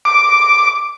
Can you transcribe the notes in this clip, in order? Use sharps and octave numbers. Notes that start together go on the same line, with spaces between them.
D6